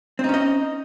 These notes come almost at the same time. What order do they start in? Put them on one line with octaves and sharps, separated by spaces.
C4 D#4 C#4 D#5